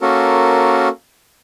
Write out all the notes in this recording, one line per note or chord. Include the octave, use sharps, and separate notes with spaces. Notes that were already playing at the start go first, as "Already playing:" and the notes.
A#3 C#4 F#4 A4 A#4